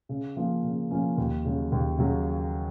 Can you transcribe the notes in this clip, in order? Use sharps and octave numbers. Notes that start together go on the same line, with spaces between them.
C#3
F3 A#3 C#4
C#3
F3 A#3 C#4
D#2
C#3 F#3
D#2
C#3 F#3